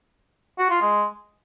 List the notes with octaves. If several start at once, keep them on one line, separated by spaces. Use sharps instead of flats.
F#4
F4
G#3